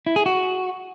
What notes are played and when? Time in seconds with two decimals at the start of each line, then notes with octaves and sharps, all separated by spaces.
0.06 E4
0.16 G#4
0.26 F#4